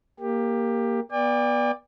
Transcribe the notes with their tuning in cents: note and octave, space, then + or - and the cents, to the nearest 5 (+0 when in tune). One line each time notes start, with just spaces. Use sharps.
A#3 +0 G4 +15
B3 -25 D5 +0 G5 +45